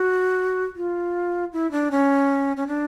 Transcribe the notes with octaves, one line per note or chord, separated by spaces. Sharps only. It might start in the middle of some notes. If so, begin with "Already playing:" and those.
Already playing: F#4
F4
E4
D4
C#4
C#4
D4